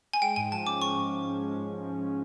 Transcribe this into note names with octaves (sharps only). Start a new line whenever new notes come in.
G#5
G#3 G5
G#2 G#5
F3 A5
C#4 D6
G#3 C#6
G#2
F3
C#4
G#3
G#2
F3
C#4
G#3